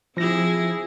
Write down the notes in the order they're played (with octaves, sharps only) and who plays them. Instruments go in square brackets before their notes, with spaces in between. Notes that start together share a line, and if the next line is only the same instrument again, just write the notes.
[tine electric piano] F3 A#6 [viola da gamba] C4 E4 G#4